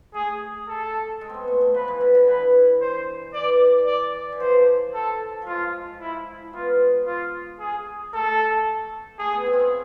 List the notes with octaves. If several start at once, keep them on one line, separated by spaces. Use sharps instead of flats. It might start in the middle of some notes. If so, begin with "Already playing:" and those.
A3 G#4
A4
G#3
B3 C4
A3
G#3
F3 B4
E3
D3
D3
E3 B4
C5
E3 D5
D5
E3
F3 C5
A4
F3 G#3 F4
E4
B3 F4
F4
G#4
A3 A4
A3 G#4
B3
C4
F4
E4